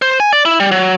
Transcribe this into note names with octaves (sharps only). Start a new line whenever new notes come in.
C5
G#5
D5
E4
G3
F#3